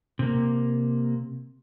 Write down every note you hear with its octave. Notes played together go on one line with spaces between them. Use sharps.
C3 A#3